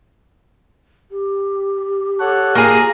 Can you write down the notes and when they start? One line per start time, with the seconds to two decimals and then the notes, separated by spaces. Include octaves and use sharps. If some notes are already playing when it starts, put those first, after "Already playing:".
1.11 G4
2.20 A4 C#5 F#5
2.55 A#3 F4 G#4 A#5